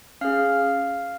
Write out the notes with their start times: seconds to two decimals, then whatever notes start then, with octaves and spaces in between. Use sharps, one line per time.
0.21 C#4 G#4 F5 F6